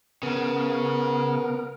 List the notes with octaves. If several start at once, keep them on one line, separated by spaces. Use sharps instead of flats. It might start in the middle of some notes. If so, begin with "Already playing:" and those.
C#3 B3 A#4